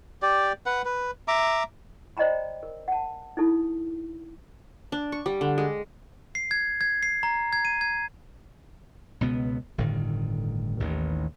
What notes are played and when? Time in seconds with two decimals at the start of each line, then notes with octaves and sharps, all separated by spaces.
0.22 G4 D5
0.66 B4 F#5
0.85 B4
1.28 E5 A#5 D6
2.17 C5 D5 D#5 G5 A#5 B5
2.63 A#4
2.88 F#5 A5
3.37 D#4 E4 A4
4.92 D4
5.12 C#6
5.26 G3
5.41 D3
5.58 G#3
6.35 C7
6.51 G#6
6.81 G#6
7.03 C7
7.23 A#5
7.53 G#6
7.65 D#7
7.81 G#6
9.21 C#2 B2 B3
9.78 G1 A2 D3 D#3
10.80 A1 D#2 D#3 E3